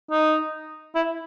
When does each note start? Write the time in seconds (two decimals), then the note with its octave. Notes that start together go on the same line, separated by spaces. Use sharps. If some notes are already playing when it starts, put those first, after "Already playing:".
0.11 D#4
0.95 E4